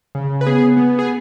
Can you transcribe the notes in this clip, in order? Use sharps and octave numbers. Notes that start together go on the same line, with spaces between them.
C#3
B4
B3 G#4
B3
G#4